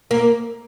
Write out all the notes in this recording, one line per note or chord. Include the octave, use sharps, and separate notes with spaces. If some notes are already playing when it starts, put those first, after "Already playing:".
A#3